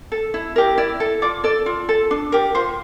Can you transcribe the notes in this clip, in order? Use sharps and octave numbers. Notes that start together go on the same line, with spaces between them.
A4
E4
G4 A#4
E4 D5
A4
F4 D5
A4 D5
F4
A4
D4
G4 A#4
F4 C5